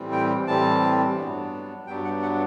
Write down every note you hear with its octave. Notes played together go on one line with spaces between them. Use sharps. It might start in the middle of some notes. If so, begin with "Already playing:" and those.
Already playing: A2 E3 G3 C4
G5
A2 E3 G3 C4 A5
G2 F#3 B3 D4
G2 F#3 B3 D4 G5
F#5
F#5